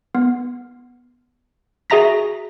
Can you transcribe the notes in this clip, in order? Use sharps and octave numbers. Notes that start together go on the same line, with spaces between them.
B3
F#4 G#4 E5 A#5 A#6 B6